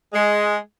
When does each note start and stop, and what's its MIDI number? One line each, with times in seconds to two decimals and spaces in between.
0.14 0.57 56